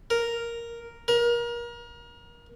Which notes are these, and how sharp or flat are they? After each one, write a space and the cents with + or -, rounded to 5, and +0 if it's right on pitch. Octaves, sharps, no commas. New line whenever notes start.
A#4 +0
A#4 +30